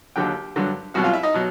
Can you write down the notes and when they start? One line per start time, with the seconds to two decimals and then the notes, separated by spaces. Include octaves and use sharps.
0.16 D#2 D3 F#3 G4 G5
0.56 G2 D3 F#3
0.94 C2 B2 F#3 F#4 F#5
1.04 F4 F5
1.13 E4 E5
1.23 D#4 D#5
1.34 B2 F#3